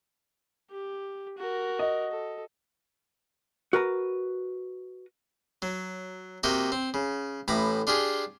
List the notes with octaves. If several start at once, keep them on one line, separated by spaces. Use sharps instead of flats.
G4
F#4 A#4
D#5
A4
F#4 A#4 B4 A#5
F#3
C3 A#3 F#4 D#5 G5
C4
C#3
A1 A2 A#5 B5 D6
D4 F4 G4 G#4